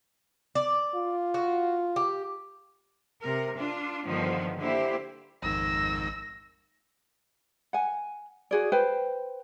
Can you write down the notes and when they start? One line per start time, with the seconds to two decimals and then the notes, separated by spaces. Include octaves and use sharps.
0.55 D5
0.95 F4
1.34 F#4
1.96 G4
3.22 C3 A#4
3.57 D4 F4
4.05 G2 D3 D#3 F3 B3
4.58 D3 A#3 E4 G4 C5
5.42 A1 F2 G#2 D#3 E6 A#6
7.73 F#5 G#5
8.51 F#4 G#4 D5
8.72 B4 C5 G5